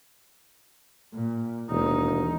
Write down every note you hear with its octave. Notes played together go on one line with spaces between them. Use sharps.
A#2
E1 D#2 D#4